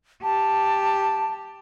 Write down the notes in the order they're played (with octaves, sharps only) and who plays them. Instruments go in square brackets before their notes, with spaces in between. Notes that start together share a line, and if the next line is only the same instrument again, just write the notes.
[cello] G4 [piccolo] A5